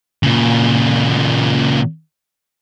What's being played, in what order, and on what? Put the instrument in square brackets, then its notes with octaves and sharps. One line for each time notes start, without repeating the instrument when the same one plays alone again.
[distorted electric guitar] A#2 C#3